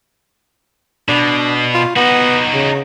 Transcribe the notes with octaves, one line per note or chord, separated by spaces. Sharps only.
B2 D4
F4
B3 D#4 F#4
C#3